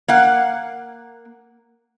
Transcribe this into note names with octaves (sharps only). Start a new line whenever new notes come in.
A#3 F5 F#5